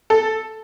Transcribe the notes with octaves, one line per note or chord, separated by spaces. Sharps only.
A4